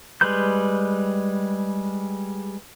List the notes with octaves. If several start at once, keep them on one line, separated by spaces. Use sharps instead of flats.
G3 G#3 B4 C6 G6